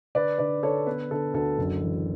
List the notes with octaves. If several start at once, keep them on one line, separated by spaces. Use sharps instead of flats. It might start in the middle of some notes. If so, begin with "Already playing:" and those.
D3 B4 D5
D3 B4 D5
D3 A4 C#5
B3 B4
D3 A4
D2 A4
F#1
E3